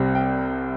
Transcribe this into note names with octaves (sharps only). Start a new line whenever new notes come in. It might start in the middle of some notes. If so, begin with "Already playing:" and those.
Already playing: C2 C3 G3 C4
G5